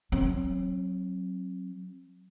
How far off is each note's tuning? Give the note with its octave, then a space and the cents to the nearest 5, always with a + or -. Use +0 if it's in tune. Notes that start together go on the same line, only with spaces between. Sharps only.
F#3 +0 C4 +45